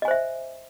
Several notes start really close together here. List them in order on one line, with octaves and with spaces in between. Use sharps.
D#5 G#5 C5 E5